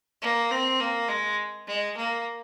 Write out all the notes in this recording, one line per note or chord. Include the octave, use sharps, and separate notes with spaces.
A#3
C4
A#3
G#3
G#3
A#3